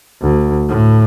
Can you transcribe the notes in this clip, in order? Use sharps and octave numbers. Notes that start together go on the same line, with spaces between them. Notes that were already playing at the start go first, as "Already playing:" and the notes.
D2
A2